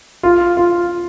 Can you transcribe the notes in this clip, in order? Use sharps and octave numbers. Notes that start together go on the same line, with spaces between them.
F4
F4